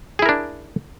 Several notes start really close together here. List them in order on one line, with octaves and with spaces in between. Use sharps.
G#4 E4 A#4 D4